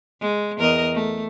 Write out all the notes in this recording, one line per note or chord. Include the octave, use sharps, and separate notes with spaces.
G#3
E2 A#4 D#5
A3